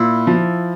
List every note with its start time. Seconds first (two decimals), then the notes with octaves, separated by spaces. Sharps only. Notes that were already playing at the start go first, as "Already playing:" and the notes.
Already playing: A#2 E4
0.27 F3